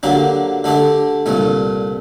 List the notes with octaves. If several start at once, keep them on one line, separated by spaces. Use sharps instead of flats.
D3 F#3 A#3 D4 G4
D3 A3 D4 G4
C2 A#2 A3